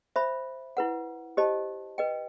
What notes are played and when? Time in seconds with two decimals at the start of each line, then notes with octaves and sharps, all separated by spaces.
0.16 C5 E5 B5
0.77 E4 B4 F#5
1.37 G4 C5 D#5 A5
1.98 B4 D#5 G5